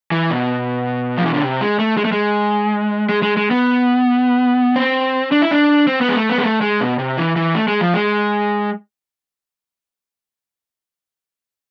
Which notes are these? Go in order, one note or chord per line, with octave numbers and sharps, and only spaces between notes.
E3
B2
F3
E3
D3
C3
G#3
A3
G#3
A3
G#3
G#3
G#3
G#3
B3
C4
D4
E4
D4
C4
B3
G#3
A3
B3
G#3
A3
G#3
B2
C3
E3
E3
A3
G#3
F3
G#3